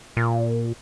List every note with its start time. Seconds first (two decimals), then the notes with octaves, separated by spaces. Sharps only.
0.17 A#2